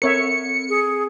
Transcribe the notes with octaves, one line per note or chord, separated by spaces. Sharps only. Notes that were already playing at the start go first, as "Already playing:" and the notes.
C4 A4 A#4 C#5 E5 C#7
G#4